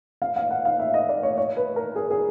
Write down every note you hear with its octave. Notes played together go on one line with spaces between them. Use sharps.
F5
F5
F#5
F5
E5
D#5
D5
C#5
C#5
B4
A#4
G#4
G#4